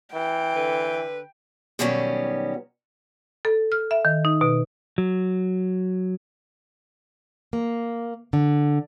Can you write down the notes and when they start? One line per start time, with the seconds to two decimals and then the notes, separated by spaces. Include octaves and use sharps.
0.14 E3 G5
0.55 D3 B4
1.79 B2 D#3 F#3 G3 B3 C#4
3.45 A4
3.72 F6
3.91 E5
4.05 D#3
4.25 D#4
4.41 B2
4.98 F#3
7.53 A#3
8.33 D3